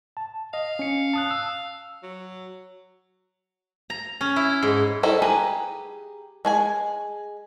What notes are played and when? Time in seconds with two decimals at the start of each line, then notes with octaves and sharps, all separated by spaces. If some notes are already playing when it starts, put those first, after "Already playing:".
0.17 A5
0.54 D#5 F5
0.79 C#4 C#7
1.13 A5 D#6 F#6
1.31 E6
2.03 F#3
3.90 A#5
4.21 C#4
4.36 E4
4.63 G#2
5.03 G3 D#4 E4 A4 C5
5.22 G4 G#4 B4 A#5
6.45 G#3 G#4 G#5